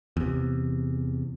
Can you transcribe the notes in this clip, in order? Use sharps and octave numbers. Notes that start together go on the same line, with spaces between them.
E2 C3